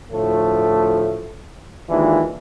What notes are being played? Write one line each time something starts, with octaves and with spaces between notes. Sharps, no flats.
D2 A2 F3 A3
D#2 E3 G#3 D4 F4